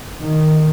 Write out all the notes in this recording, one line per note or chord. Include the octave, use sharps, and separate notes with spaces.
D#3